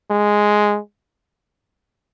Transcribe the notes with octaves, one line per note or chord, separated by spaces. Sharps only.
G#3